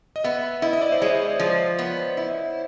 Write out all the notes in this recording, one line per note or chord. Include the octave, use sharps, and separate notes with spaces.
D#5
B3 E5
E4 D#5
D#5
D5
C5
G#3 C#5
F3
B3
E4